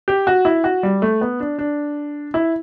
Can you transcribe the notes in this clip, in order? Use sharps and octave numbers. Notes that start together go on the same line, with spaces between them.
G4
F#4
E4
F#4
G3
A3
B3
D4
D4
E4